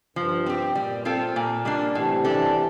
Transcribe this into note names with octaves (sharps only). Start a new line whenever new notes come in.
G2 F3
C4 G4
C3
A#2 G3
C4 F4 A4
A#2
G3 A#3 D4
A2 C3 E3
G3 D4 A4